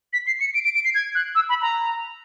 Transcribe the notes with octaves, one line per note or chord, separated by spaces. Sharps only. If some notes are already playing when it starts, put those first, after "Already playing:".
B6
C7
C#7
D7
D7
D7
C7
G#6
F#6
E6
B5
A#5